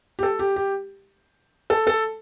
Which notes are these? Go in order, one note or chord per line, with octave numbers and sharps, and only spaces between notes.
G4
A4
G4
G4
A4
A4